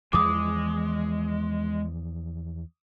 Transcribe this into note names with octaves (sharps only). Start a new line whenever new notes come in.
E2 E3 F3 G#3 D6 D#6